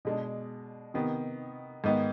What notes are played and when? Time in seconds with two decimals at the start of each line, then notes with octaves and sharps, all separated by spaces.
0.05 B2 G#3 D4
0.94 C3 D#3 B3
1.84 G#2 D#3 B3 D#4